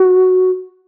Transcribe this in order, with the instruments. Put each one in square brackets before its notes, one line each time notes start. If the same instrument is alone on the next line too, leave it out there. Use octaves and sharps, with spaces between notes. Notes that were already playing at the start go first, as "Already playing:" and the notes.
Already playing: [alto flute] F#4